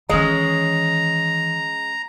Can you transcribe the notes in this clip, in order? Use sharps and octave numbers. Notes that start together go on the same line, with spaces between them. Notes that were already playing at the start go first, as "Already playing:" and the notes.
D#3 E3 G#3 C#4 D#5 A#5